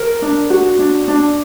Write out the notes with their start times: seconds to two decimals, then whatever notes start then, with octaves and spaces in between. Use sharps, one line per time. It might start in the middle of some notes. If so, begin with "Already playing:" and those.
Already playing: A#4
0.22 D4
0.50 F#4
0.79 D4
1.08 D4